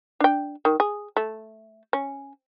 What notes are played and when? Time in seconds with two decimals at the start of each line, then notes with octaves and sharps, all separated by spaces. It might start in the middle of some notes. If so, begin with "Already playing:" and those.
0.20 D4 G5
0.65 D#3
0.80 G#4
1.17 A3
1.93 C#4